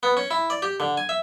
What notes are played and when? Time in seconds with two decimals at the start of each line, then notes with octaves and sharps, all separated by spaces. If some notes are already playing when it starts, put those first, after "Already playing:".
0.03 B3
0.17 C#4
0.31 E4
0.50 D5
0.62 G4
0.80 D3
0.97 G#5
1.09 E5